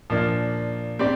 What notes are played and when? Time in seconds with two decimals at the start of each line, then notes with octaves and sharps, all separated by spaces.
0.10 A#2 F3 A#3 D4
0.99 C4 G4 D5